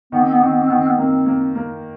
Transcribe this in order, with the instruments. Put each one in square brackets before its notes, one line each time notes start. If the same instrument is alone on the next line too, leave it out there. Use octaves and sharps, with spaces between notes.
[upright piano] D#3 [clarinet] B3
[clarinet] C4
B3
[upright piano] D#3 [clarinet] C4
[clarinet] B3
C4
[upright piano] D#3 [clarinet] B3
[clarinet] C4
B3
[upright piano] A#3 [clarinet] C4
[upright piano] A#3
A#3